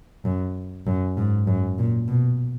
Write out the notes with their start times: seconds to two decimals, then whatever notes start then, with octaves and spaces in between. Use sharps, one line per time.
0.25 F#2
0.87 F#2
1.17 G#2
1.47 F#2
1.78 A#2
2.08 B2